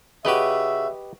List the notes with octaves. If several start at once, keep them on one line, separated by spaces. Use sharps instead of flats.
C#3 F#4 G4 B4 D#5 E5